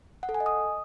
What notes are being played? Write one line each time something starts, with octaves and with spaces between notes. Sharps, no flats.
F#5
A4
G#5
D#5
D#6